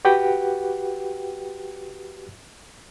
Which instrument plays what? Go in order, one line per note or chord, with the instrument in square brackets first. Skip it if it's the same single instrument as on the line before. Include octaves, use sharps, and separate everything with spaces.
[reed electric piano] F#4 G4 B4 F#5 G5